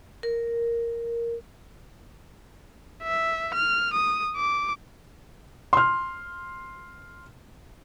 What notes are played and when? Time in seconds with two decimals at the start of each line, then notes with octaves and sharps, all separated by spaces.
0.23 A#4
3.03 E5
3.55 F6
3.94 D#6
4.36 D6
5.73 C6 F6